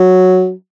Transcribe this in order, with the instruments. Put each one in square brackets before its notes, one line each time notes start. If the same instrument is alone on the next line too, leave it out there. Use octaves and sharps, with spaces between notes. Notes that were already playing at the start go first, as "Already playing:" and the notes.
Already playing: [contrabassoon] F#3